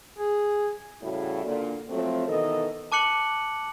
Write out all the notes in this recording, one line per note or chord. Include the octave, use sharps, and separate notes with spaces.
G#4
A2 C#3 G3 E4 F#4
A#2 D3
F2 F3 F#3 A3 C4
B2 D#3 E3 A4 A#4 D#5
A5 D6 F#6 C#7 F#7